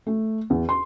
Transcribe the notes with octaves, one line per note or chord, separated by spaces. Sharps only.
A3
E2
C6